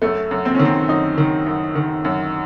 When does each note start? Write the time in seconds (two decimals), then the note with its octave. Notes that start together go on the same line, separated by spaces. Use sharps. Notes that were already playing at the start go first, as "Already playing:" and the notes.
0.02 F#2 A3
0.31 F#2
0.45 C4
0.55 C#4
0.59 D#3
0.65 C4
0.89 F#2 D#4
1.18 D#3
1.46 F#2
1.75 D#3
2.05 F#2